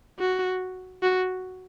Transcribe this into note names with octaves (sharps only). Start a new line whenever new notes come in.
F#4
F#4